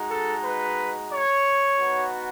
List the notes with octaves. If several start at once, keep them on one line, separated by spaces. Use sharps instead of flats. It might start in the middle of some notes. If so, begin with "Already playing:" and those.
Already playing: G#3 D#4 F#4
A4
B4
C#5
B3 D#4 F#4